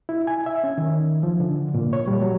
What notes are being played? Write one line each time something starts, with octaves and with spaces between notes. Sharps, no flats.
E4
G#5
E5
C#4
D#3
F3
D3
A#2
C#5
G3
F#3